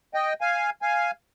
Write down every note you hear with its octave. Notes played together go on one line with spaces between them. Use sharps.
D#5 G5
F5 G#5
F5 G#5